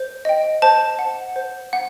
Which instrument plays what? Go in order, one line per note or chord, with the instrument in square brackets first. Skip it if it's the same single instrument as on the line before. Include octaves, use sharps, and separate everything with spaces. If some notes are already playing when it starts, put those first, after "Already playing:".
Already playing: [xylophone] C5
D#5 G5
C5 A5
F#5
C5
F#5